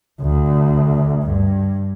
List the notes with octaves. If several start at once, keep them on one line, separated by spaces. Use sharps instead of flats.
D2
G2